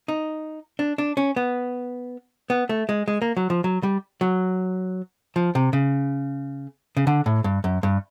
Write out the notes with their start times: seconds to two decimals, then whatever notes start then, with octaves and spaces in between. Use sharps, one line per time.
0.08 D#4
0.79 D4
0.98 D4
1.17 C#4
1.36 B3
2.50 B3
2.69 A3
2.89 G#3
3.08 G#3
3.22 A#3
3.37 F#3
3.50 F3
3.64 F#3
3.83 G3
4.21 F#3
5.36 F3
5.55 C3
5.73 C#3
6.97 C#3
7.07 D3
7.26 A2
7.44 G2
7.64 F#2
7.83 G2